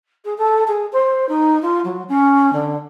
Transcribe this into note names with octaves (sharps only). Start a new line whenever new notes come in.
G#4
A4
G#4
C5
D#4
F4
F#3
C#4
D3